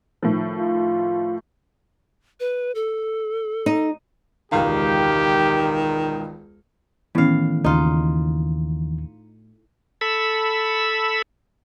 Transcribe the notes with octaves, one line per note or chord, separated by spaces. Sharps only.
A2 D#3 F3
F4
B4
A4
D#4
E1 C#2 D#3 G4 F5
A2 D#3 E3 B3 C#4 F5
D#2 C#3 D#4 F4
A4 B5 E6